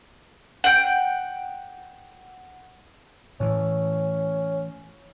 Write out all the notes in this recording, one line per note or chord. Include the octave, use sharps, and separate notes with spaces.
F#5 G5
A2 E3 C#4